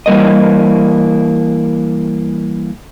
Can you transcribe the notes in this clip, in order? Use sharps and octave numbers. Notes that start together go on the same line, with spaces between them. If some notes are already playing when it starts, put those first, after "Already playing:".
E3 G3 A#3 D#5